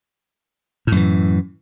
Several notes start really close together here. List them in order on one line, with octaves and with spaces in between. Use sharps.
A2 F#2 E3